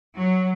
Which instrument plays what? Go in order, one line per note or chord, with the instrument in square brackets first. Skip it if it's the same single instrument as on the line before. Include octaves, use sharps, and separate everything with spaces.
[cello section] F#3